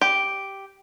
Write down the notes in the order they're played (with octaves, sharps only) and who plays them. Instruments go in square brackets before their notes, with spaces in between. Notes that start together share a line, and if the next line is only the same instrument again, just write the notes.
[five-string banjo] G4